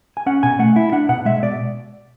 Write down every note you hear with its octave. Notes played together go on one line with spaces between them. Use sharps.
G#5
C#4 F#5
B2 G#5
A3 F#5
E4
D4 F#5
B2 F#5
G#3 E5
B2 D5